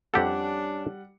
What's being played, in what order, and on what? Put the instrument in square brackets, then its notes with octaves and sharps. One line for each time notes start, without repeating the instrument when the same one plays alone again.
[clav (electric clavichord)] F2 G4 A4 [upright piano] G3 F#5 [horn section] C#4 D4